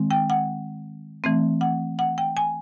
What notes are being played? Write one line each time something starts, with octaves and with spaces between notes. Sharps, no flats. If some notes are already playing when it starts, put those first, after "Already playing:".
Already playing: D#3 G#3 C4
G5
F#5
E3 A3 C4
F#5
F#5
G5
G#5